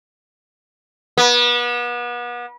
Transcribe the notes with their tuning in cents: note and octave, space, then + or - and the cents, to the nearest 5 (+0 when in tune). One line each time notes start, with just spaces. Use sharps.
B3 -35